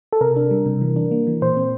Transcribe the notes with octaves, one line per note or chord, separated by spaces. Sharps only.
A4
C3 A#4
D4
G3
C3
E3
D4
A#3
E3
A#2 C5
C4